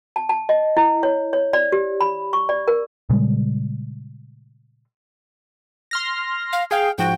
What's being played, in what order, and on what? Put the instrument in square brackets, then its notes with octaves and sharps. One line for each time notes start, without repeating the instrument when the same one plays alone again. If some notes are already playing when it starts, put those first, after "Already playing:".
[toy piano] A5
A5
D#5
E4
C#5
C#5
D5
G4
B5
C#6
D5
A#4
[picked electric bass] A#2 C#3 G3 G#3
[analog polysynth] C6 F6 A#6
[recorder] F5
[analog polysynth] G#4 F5 [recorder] G5
[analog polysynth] G#2 F3 F#4 [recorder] G5